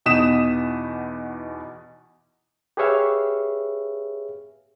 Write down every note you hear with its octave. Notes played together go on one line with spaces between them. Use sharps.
E2 B2 D#4 D#6 B6 E7
G4 G#4 B4 C#5 E5 F5